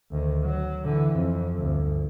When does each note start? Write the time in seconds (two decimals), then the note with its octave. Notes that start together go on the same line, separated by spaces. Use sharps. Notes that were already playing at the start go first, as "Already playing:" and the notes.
0.11 D2 D#3
0.43 F#3
0.84 D3 E3
1.15 F2
1.58 G1 D2